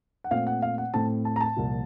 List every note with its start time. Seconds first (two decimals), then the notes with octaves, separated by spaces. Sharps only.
0.24 F#5
0.31 A#2 A3 C4 F5
0.47 F#5
0.62 F5
0.78 F#5
0.94 A2 A3 C4 A5
1.25 A5
1.36 A#5
1.41 A5
1.56 C2 A#2 F3